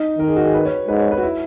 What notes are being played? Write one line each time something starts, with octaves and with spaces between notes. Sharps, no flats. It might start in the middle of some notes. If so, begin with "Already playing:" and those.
Already playing: D#4
D#3 A#4
G#4
F#4
G#4
B4
C#5
G#2 B4
C#5
B4
F#4
E4